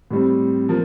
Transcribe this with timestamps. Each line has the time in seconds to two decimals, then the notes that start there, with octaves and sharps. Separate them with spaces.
0.11 A2 G3 C4
0.69 F3 A#3